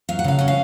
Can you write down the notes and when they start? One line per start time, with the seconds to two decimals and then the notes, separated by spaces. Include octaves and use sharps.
0.09 F#3 F5
0.19 F#5
0.24 C#3 F5
0.39 C#4 F#5
0.48 F5